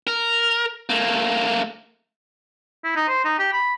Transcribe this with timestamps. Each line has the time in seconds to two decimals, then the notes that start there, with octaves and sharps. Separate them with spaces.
0.07 A#4
0.89 A3 A#3
2.84 E4
2.96 D#4
3.09 C5
3.25 D#4
3.39 G4
3.53 B5